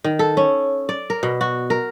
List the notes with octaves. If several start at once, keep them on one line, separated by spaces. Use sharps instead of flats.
D#3
A4
C#4
D5
A#4
B2
F#4
A#4